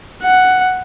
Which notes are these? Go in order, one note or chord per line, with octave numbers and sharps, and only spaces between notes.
F#5